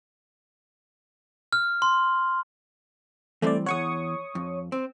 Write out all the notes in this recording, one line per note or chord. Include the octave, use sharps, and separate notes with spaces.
F6
C6
E3 G3 A3 C4 D5
E2 D#3 C#5 F#5 C#6 D#6
F2
C4